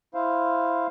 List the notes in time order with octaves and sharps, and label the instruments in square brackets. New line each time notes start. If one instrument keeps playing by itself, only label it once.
[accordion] E4 C5 F5